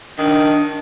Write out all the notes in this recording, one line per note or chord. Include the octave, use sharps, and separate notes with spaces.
D#3 D4